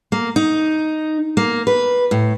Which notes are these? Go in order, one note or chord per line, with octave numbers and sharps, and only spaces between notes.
A#3
D#4
A#3
B4
A2